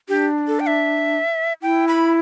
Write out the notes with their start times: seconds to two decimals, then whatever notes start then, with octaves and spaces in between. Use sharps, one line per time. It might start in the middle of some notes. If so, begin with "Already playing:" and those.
0.09 D4 G4
0.48 A4
0.60 G5
0.67 E5
1.62 E4 G5
1.88 B5